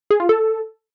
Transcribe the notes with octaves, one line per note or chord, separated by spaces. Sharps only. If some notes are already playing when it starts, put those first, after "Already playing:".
G#4
F4
A4